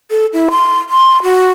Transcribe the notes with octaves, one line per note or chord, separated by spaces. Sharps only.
A4
E4
C6
C6
F#4